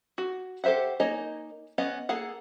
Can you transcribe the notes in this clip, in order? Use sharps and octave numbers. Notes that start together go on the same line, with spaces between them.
F#4
G4 A4 C5 E5 F#5
A#3 D#4 C#5 D#5 G#5
B3 C#4 D#5 F#5
A#3 G#4 A4 F#5